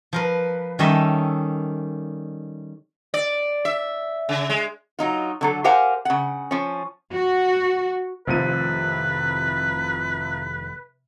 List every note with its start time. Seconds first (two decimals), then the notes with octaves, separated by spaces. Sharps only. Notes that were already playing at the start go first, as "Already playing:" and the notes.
0.13 F3 A#4 B4
0.79 D#3 G3 C#4 A4 D#5 E5
3.14 D5
3.65 E5
4.29 C#3
4.49 G#3
4.99 F#3 D#4 F4
5.41 D3 F#3 A4
5.64 G4 A#4 C5 F5 F#5 G#5
6.05 C#3 F#5
6.51 F3 C#4
7.12 F#4
8.27 F1 A2 C3 D#3 F3 B4 D#7